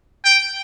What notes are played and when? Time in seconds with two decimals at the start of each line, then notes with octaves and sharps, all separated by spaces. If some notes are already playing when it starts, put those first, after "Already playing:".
0.25 G5